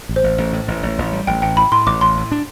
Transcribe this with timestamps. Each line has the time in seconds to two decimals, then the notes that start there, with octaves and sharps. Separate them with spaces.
0.09 A1
0.16 C5
0.24 A1
0.38 A1
0.53 A2
0.68 A1
0.83 A1
0.98 A1
1.12 G3
1.27 A1 G5
1.42 A1 G5
1.57 A2 B5
1.72 A2 C6
1.86 A1 D6
2.01 A1 C6
2.17 A2
2.32 D4